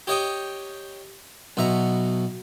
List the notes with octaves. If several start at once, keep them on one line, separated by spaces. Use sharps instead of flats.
G4 C#5 D#5 G5 C#6 D#6
B1 B2 E5 A#5 C#6